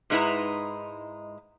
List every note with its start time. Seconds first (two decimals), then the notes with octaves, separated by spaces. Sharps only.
0.10 G#2 G#3 D#4 E4 B4 A#5